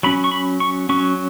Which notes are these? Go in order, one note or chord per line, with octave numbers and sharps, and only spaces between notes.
F#3 C#4 B5
C#6
B5
C#6
F#3 C#4 C#6